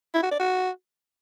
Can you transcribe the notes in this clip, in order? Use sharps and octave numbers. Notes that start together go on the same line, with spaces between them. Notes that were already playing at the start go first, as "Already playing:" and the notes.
E4
F#4
D5
F#4